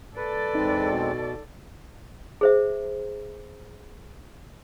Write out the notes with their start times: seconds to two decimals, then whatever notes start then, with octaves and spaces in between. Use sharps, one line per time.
0.17 A4 B4 D5
0.55 E2 G#3 C4 D#4
0.90 B2
2.41 G#4 C5 E5